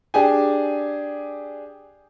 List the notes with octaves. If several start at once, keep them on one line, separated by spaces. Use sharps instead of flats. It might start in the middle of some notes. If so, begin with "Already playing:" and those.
D4 G4 G#4 G#5